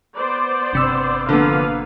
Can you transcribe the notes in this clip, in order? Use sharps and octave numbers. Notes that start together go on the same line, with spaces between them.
B3 C5 D5
G1 C3 E6
D3 F3 A#3 B3 B4 F5